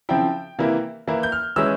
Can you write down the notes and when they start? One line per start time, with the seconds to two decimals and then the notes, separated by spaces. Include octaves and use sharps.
0.09 C#3 F3 C4 E4 G5
0.59 C3 E3 A#3 E4
1.07 E3 A#3 E4
1.23 G6
1.32 F6
1.56 E3 G#3 C#4 E4 E6